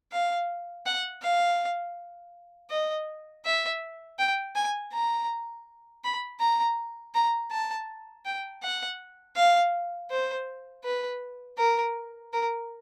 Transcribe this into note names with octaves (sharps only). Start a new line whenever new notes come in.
F5
F#5
F5
D#5
E5
G5
G#5
A#5
B5
A#5
A#5
A5
G5
F#5
F5
C5
B4
A#4
A#4